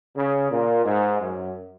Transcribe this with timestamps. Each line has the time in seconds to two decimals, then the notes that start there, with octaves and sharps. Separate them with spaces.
0.17 C#3
0.51 A#2
0.85 G#2
1.20 F#2